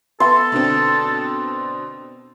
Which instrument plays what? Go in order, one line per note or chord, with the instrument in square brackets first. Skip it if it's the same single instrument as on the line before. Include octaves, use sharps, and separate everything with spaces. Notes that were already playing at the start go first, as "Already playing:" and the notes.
[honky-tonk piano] B3 E5 [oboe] A4 [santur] C6
[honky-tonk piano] B2 D3 C4